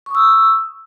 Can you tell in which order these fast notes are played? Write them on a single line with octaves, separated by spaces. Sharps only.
C#6 D#6 E6